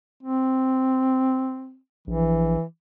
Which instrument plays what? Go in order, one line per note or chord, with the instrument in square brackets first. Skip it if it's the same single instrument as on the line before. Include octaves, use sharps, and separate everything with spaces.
[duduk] C4
[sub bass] A#1 [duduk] E3